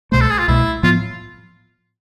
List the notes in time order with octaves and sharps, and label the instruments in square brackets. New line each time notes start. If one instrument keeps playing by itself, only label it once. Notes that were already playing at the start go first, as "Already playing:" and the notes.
[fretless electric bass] C2 B2 A3 [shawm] C5
[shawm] A4
G#4
F4
[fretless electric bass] C2 B2 A3 [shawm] E4
[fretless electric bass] A2 F3 B3 [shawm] F4